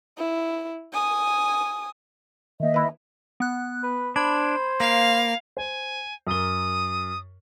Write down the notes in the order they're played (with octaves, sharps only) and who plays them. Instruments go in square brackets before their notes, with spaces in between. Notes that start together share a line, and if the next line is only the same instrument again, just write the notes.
[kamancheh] E4
G#5 D#6
[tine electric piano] D#3 A#3 [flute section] D#5 E5
[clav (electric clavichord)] E4 B4
[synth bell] B3 F#6
[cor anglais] B4
[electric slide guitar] D4 [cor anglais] C5 [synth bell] B5 G#6
[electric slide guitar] A#3 [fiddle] F5
[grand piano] C5 [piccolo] G#5
[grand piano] F#2 A#4 G7 [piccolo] D#6